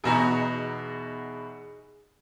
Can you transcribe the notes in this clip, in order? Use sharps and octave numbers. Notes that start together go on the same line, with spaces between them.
E2 B2 D#4 F#4 G#4 A#5